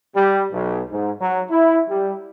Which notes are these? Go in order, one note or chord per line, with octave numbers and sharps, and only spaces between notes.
G3
B1
G#2
F#3
E4
G3